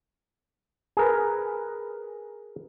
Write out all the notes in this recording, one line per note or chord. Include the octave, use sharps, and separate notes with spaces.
G#4 A#4 B4